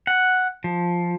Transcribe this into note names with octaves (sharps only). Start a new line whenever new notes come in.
F#5
F3